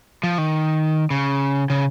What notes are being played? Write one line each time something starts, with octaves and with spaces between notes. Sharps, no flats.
F3
D#3
C#3
C#3